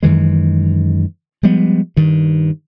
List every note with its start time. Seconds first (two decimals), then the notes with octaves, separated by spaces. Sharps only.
0.03 F#2 D#3 E3 G#3
1.43 F3 G3 G#3 B3
1.97 G2 D#3